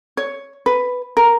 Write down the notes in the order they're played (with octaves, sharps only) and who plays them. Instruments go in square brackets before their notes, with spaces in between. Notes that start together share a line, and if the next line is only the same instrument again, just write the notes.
[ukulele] C#5
B4
A#4